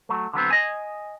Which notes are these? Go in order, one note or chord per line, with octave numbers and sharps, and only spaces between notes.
F#3 A3
D3 F#3 B3 C4
D#5 G#5